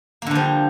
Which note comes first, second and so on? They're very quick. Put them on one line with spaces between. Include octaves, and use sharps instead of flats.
A#3 D3 F3 G3